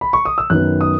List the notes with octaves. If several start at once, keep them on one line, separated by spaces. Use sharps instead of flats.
B5
C#6
D#6
E6
F#2 D#3 F#3 B3 F#6
D#6